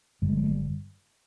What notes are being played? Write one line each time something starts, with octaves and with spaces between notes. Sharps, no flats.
G1 G2 D3 G3
G#3
G3
G#3
G3